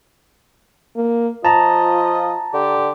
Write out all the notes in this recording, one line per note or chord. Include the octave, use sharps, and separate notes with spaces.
A#3
F3 F4 D#5 A5 A#5
D3 G4